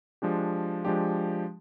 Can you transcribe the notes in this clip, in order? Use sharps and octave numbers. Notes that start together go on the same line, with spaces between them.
F3 G#3 D4 G4
F3 G#3 D4 G4